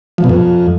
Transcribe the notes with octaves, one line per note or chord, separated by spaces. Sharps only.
F3
B2
F2